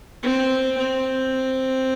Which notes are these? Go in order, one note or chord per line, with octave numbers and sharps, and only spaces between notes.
C4
C4